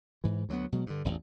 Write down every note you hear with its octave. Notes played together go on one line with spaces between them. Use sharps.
G#2 E3
D2 F#3 A3 B3
B2 F#3 G#3
G2 D3
E1 A1 E2